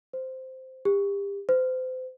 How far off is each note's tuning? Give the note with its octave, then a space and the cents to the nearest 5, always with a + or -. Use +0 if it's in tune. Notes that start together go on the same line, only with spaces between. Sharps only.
C5 -5
G4 +30
C5 -30